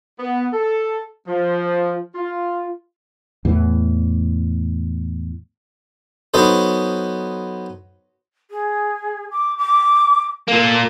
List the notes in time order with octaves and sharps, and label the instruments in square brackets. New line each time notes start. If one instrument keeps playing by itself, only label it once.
[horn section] B3
A4
F3
F4
[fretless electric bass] E2 A2 E3
[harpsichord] F#3 B3 D#4 A4 C5
[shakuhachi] G#4
D6
D6
[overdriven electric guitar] A#2 A#3 [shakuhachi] A4